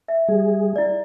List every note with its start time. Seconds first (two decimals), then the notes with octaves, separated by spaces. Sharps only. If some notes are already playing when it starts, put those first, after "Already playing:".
0.08 E5
0.28 G3 G#4
0.76 E4 D5